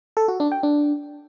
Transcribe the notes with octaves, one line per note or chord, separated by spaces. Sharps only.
A4
F#4
D4
G5
D4